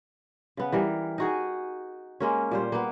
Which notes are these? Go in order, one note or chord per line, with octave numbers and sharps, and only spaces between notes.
C#3 B3
E3 G3 A#4
D#4 F#4 G#4
G#3 A#3 C#4
A#2 G3 C5
A#3 B3